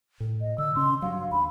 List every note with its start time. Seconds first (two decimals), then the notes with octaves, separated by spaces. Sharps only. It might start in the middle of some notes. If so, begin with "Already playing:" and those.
0.20 A2
0.41 D#5
0.58 D3 E6
0.75 C#3 C#4 C6
1.02 G2 F#3 F5
1.31 D#2 B5